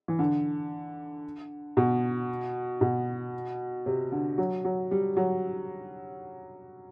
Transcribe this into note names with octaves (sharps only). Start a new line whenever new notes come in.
E3
D3
B2
B2
C3
D3
F#3
F#3
G3
F#3